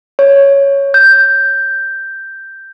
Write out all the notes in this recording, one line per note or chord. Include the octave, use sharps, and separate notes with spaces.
C#5
G6